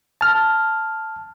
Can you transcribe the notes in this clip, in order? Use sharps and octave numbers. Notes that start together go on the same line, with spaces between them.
A5 F6